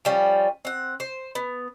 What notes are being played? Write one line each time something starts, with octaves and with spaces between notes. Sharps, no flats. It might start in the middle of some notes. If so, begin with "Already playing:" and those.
F3 G3 C#4
C4 F#5
C5
B3